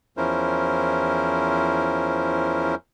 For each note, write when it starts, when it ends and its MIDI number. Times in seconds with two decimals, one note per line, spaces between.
0.17 2.75 40
0.17 2.75 53
0.17 2.75 61
0.17 2.75 64
0.17 2.75 70
0.17 2.75 72